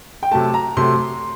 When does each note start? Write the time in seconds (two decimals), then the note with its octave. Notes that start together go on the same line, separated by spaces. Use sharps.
0.23 G5
0.31 C3 F#3 A3 A5
0.54 A#5
0.77 C3 F#3 A3 C6